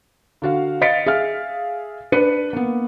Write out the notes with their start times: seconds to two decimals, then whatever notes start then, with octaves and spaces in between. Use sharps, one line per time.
0.42 D3 F#4 F5
0.81 D#5 F5 A6 B6 C#7 D7
1.06 G#4 E5 F5 F6
2.12 D4 B4 C#7 D#7
2.53 A#3 B3